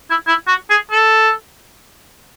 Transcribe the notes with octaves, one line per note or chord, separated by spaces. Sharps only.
E4
E4
F#4
G#4
A4